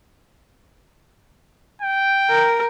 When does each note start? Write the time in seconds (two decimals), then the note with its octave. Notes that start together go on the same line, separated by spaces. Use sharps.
1.82 G5
2.30 A#4